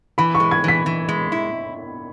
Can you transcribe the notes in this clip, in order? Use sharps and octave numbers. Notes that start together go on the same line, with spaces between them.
E3 B5
C#6
G#3
G#6
E3 B6
E3
G#3
E4